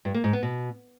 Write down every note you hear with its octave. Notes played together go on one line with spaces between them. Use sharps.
G2
A#3
G#2
B3
B2